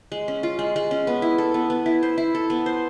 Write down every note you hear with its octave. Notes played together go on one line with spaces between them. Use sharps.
G#3
C#4
F4
G#3
G#3
C#4
B3
E4
A4
B3
B3
E4
C5
E4
A4
B3
C5